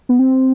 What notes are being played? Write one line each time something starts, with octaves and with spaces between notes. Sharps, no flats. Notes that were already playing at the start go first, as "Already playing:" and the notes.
B3
C4